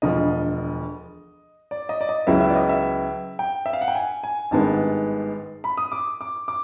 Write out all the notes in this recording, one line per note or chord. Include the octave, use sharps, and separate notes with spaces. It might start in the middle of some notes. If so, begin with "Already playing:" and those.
E1 D2 D3 F3 D#5
D5
D#5
D5
D#5
C#2 C#3 F#3 B3 E4 E5
E5
D5
D#5
E5
G5
E5
F5
F#5
G5
G#5
G#5
G#1 G2 D#3 G#3 B3 A5
B5
D#6
D6
D6
D6